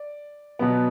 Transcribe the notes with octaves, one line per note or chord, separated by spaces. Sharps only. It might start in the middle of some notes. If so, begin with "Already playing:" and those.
Already playing: D5
B2 F#3 B3